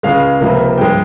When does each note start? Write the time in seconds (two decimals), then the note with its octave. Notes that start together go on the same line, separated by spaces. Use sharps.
0.03 C#2 C#3 G#3 F5
0.40 C#2 C3 F3 A#3
0.78 G2 F3 G#3 G5